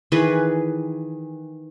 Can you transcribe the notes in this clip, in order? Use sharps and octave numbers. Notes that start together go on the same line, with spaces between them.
D#3 E3 G#4 B4